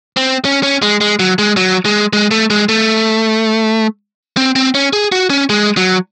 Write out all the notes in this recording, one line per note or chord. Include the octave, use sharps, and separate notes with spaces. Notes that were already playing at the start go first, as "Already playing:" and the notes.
C4
C#4
C#4
G#3
G#3
F#3
G#3
F#3
G#3
G#3
A3
G#3
A3
C4
C4
C#4
G#4
F#4
C#4
G#3
F#3